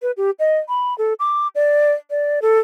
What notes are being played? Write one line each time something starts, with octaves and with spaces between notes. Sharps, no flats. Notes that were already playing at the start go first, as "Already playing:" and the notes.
B4
G4
D#5
B5
A4
D6
D5
D5
A4